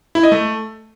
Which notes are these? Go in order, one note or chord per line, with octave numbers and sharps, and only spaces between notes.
E4
D#5
A3